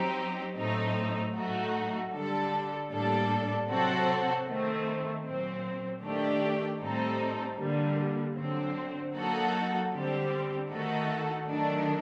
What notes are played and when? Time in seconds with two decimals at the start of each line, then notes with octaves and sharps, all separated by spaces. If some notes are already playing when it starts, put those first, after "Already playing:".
Already playing: F#3 C4 D#4 G4
0.56 A2 F#3 A3 C4 D#4
1.34 A2 F#3 A3 D#4 F#4
2.12 D3 G3 D4 A4
2.90 A2 G3 A#3 D4 A4
3.68 C3 F#3 C4 F#4 A4
4.46 D#3 A3 C4
5.23 A#2 F#3 C4
6.01 D#3 A3 D4 G4
6.79 A2 G3 C4 D#4 A4
7.58 D3 G3 A#3
8.35 D3 F#3 C4
9.13 F#3 A#3 D#4 F#4 A4
9.91 D3 G3 C4 G4
10.69 D#3 A3 D#4 F#4 A4
11.47 D#3 F#3 A3 D4